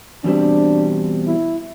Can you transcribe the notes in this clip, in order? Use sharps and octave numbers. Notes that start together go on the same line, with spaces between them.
E2 B2 G3 C4 D4 G4
E4